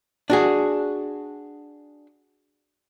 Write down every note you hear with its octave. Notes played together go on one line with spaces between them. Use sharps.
D4 F#4 G#4